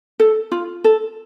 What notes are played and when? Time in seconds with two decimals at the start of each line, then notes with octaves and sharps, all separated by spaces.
0.20 A4
0.52 F4
0.84 A4